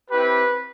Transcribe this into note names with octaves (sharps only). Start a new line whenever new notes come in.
C4 E4 G4 B4